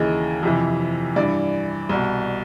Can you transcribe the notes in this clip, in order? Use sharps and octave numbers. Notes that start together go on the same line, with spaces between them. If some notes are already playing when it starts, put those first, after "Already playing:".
Already playing: D#2 C#3 E3 D#5
F2 C3 E3
G2 E3 D5
C2 B2